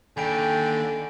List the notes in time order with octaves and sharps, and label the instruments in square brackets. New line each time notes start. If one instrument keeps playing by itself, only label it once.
[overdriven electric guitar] D#2 [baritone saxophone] D3 [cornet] G5 [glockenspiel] G#5 B5 D7